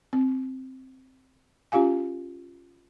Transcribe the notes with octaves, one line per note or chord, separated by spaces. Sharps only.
C4
C#4 F4 G4 F5 G#5